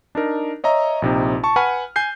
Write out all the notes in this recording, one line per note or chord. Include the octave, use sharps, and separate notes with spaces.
D4 D#4 A#4
C#5 D#5 E5 A#5
A#1 C3 D#4
A5 C#6
B4 F#5 G#5 B5 F6
G#5 G6 C7